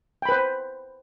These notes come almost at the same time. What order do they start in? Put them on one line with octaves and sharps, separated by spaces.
G5 B5 B4 C5